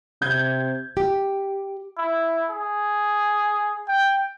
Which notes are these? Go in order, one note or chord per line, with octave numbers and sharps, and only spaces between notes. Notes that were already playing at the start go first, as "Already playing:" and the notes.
C3 G6 G#6
G4
E4
G#4
G5